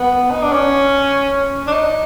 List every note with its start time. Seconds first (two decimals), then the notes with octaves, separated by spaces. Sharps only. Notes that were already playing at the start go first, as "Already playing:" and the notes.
Already playing: B3
0.31 D#4
0.42 D4
0.52 C#4
1.67 D4
1.72 D#4